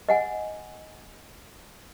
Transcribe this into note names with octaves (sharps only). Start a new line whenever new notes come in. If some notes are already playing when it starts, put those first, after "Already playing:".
D#5 F#5 G#5